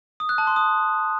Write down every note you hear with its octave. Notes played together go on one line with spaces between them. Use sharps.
D#6
F#6
A5
C6
D#6